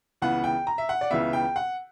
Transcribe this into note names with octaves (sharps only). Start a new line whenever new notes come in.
C#2 C#3 E3 B3 F#5
G5
A#5
E5
F#5
D5
C#2 C#3 E3 B3 E5
G5
F#5